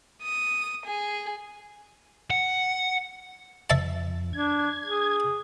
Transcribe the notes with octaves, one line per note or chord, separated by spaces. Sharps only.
D#6
G#4
F#5
F2 E5 A5
D4 G#6
G#4